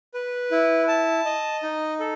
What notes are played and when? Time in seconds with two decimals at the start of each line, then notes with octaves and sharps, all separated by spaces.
0.14 B4
0.51 E4
0.88 A5
1.25 D#5
1.63 D#4
1.99 A4